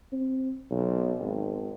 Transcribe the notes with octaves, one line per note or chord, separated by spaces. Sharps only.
C4
B1
G#1